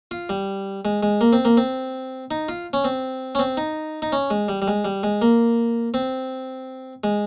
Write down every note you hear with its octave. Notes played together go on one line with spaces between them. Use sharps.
F4
G3
G#3
G#3
A#3
C4
A#3
C4
D#4
F4
C#4
C4
C#4
C4
D#4
D#4
C#4
G#3
G3
G3
G#3
G3
G#3
A#3
C4
G#3